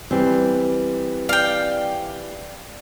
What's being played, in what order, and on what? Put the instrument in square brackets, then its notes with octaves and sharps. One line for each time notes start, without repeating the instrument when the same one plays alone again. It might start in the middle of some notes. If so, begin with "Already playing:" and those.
[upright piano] E3 G3 [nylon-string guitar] C4
[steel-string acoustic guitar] D5 [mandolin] F5 G5